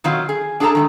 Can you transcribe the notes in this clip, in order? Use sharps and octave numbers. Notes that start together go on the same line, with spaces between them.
B2 D#3 F#3 C4 F4
G#4
D4 G#4 A4 F#5 A5 A#5
D#3 G3 G#3